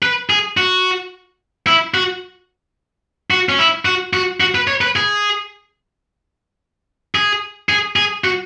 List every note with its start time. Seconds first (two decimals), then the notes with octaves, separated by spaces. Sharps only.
0.03 B4
0.30 G#4
0.57 F#4
1.67 E4
1.94 F#4
3.30 F#4
3.49 C#4
3.59 E4
3.85 F#4
4.13 F#4
4.40 F#4
4.55 B4
4.67 C#5
4.81 B4
4.96 G#4
7.15 G#4
7.69 G#4
7.96 G#4
8.24 F#4